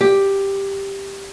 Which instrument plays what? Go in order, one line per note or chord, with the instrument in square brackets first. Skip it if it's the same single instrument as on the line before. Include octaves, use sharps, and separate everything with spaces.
[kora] G4